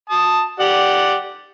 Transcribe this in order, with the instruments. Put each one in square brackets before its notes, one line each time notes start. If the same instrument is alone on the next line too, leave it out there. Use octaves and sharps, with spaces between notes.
[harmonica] A5 D#6
G4 D5 F#5